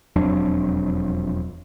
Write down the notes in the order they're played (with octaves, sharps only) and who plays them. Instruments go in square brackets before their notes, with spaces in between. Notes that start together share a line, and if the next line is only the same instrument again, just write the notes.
[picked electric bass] E1 F2 F#3 D4